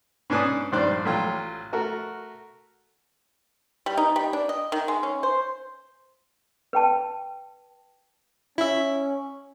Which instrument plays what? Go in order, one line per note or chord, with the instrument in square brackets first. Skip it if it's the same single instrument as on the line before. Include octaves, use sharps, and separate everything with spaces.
[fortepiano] G#2 C#4 D4 B4 G#5 D#6
A#1 G2 D#3 C5 D5 F#6
A1 F#3 F4 G5
A3 F#4 A#4
[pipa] G3
D#4
G3
D4
D#5
D#3
G#3
C#4
C5
[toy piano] B4 G5 A5
[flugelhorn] C#4 [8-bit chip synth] E4 E5